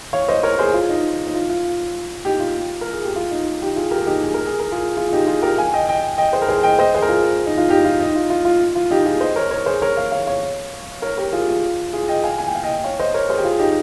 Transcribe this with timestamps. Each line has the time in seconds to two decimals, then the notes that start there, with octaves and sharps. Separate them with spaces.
0.13 C#5 F5
0.28 C5 D#5
0.43 A#4 C#5
0.59 G#4 C5
0.74 F4
0.89 D#4
1.28 D#4
1.35 F4
1.49 F4
2.25 D#4 G4
2.40 F4
2.81 A#4
2.93 G#4
3.04 G4
3.16 F4
3.31 D#4
3.61 D#4 G4
3.76 F4 G#4
3.91 G4 A#4
4.00 G#4
4.07 D#4 G4
4.22 G#4
4.34 A#4
4.46 G#4
4.60 A#4
4.72 F4 G#4
4.97 F4 G#4
5.08 F4
5.12 D#4 G4
5.27 F4 G#4
5.42 G4 A#4
5.58 F5 G#5
5.74 D#5 G5
5.89 D#5 G5
6.18 D#5 G5
6.33 G#4 C5
6.42 A#4
6.49 G#4 C5
6.63 D#5 G5
6.79 C5 D#5
6.95 G#4 C5
7.02 A#4
7.09 F4 G#4
7.47 D#4
7.58 F4
7.69 D#4 G4
7.85 F4
8.00 D#4
8.16 F4
8.30 F4
8.45 F4
8.75 F4
8.91 D#4 G4
9.06 F4 G#4
9.21 C5 D#5
9.36 A#4 C#5
9.51 A#4 C#5
9.66 G#4 C5
9.82 A#4 C#5
9.97 C#5 F5
10.12 C#5 F5
10.26 C#5 F5
11.02 A#4 C#5
11.18 G4 A#4
11.32 F4 G#4
11.41 G4
11.49 F4
11.93 F4 G#4
12.08 D#5 G5
12.24 F5 G#5
12.38 G#5
12.47 G5
12.55 F5
12.63 D#5 G5
12.84 C#5 F5
12.99 C5 D#5
13.14 A#4 C#5
13.29 G#4 C5
13.38 G4
13.44 F4 G#4
13.59 D#4 G4